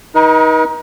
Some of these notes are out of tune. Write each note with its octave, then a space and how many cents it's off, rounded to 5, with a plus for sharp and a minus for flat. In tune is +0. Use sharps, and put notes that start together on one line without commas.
D#4 +20 B4 -45